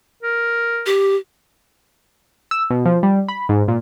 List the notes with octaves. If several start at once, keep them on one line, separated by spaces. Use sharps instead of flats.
A#4
G4
E6
B2
F3
G3
B5
G#2
A#2